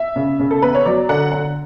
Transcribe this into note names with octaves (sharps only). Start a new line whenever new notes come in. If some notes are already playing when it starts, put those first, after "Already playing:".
Already playing: E5
C#3
C#3
A4
E2 B4
C#5
F#3 D5
D3 F#5
D3 F#5